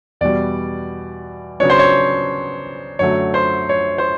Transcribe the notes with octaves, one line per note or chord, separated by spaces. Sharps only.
E2 B2 G3 D5
C#3 F#3 B3 D4 C#5
C5
C#5
F#2 D3 F#3 A3 C#5
C5
C#5
C5